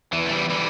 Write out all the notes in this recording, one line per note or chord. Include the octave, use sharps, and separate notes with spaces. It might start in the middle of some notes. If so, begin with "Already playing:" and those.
E2 E3
A3
E3 G3
D3 E3 G3